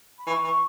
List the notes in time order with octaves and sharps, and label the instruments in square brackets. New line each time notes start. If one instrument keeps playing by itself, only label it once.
[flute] B5
[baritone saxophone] E3 [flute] C#6
[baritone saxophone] E3 [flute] C#6